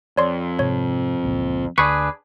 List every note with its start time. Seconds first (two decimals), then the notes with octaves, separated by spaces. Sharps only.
0.17 F2 C#5 D5 C6
0.59 G#2 C3 C#5
1.23 G1 C#2 A#2
1.78 D2 D4 G#4 B4 C#6 C#7